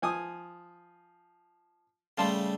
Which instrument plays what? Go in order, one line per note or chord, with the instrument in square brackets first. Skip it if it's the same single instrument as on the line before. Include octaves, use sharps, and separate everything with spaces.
[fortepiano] F3 G#5 D#6
[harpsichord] C#3 G3 A3 [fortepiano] F5 A5 C6